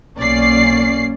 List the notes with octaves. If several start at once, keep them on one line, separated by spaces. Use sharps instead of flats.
B1 A#3 C#4 D5 C7